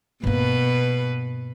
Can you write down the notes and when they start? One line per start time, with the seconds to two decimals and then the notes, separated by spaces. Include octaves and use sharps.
0.23 G2 B2 A#3 B4